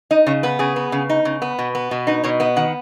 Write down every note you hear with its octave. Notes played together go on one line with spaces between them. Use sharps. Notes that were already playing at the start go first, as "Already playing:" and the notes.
D#4 D#5
C#3 C#5
B3 B4
C#3 G#4
B3
C#3
D#4
C#3
B3
B2
B3
B2
D#4 B4
B2 C#5
B3 D#5
D#3 F#5